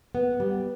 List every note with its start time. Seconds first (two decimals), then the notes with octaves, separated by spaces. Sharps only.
0.15 B3
0.40 G3